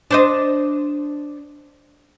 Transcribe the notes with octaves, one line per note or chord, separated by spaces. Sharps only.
D4 C5 D#5